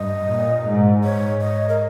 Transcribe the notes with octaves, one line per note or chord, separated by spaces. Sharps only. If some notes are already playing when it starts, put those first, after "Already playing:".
Already playing: G2 D#5
A#2
G#2
C#5
D#5
A#4